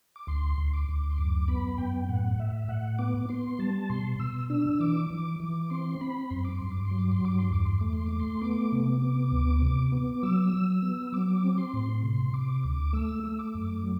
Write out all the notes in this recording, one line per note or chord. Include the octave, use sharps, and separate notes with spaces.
D6
D2 C6
D2
D6
D2
C6
F#2 D6
B3 B5
F#2 G5
A2 F#5
A2 E5
A2 F#5
B3 D6
B3 C6
G3 A5
B2 C6
B2 E6
D4 E6
E3 D6
E3
E3
C4 C6
C4 B5
F#2 C6
D6
G2 C6
D6
C6
F#3
D6
C6
G2 D6
C6
E2 D6
C6
A3 D6
C6
D6
A3
C6
B3 D6
C3
B3
D2
C3
B3
F#3 E6
F#3
B3
F#3 D6
C4
C6
A2
C3 C6
C3 D6
D2 D6
A3 E6
A3
D6
F#2
F#3